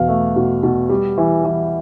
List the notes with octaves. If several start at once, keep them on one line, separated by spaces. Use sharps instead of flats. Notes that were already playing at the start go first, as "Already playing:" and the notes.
Already playing: E2 B2 F5
A3
B2
B2
G3
E3
E3